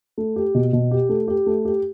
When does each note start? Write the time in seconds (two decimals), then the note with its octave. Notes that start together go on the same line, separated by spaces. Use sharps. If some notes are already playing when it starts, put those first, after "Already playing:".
0.18 A3
0.36 G4
0.55 B2
0.73 B2
0.91 G4
1.09 A3
1.28 G4
1.46 A3
1.65 G4